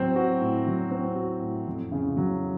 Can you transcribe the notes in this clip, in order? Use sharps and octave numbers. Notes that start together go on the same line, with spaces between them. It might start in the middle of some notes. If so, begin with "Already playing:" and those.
Already playing: A2 F#3 C4
F#4
A2
F#3
C4
F#4
A2
F2
C#3
F#3